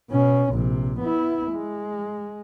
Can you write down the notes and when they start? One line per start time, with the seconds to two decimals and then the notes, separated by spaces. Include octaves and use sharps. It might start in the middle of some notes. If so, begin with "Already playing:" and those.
0.10 B2 C#4
0.53 A#1 C3
1.00 B3 E4
1.52 G#3